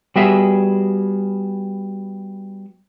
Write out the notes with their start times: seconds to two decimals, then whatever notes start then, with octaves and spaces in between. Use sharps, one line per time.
0.16 G3 B3 F#4 G#4 E5